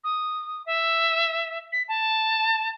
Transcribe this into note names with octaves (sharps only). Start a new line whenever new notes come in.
D#6
E5
B6
A5